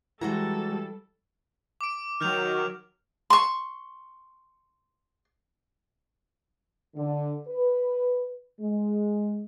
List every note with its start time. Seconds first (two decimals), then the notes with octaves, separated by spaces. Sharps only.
0.21 E3 G3 G#3 F#4 A4 A#5
1.81 D6 D7
2.21 D#3 F#3 F6 G6 F7
3.30 C6 C#6
6.96 D3
7.48 B4
8.60 G#3